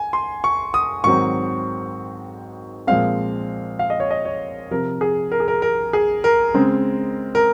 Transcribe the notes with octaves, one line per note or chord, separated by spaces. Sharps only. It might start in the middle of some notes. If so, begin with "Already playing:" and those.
Already playing: G#5
C6
C#6
D#6
G#2 D#3 F#3 C4 C#6
A#2 F3 G#3 C4 F5
F5
D#5
C#5
D#5
C#5
C3 F3 C4 A#4
G#4
A#4
G#4
A#4
A#4
G#4
A#4
C#3 G#3 C4
A#4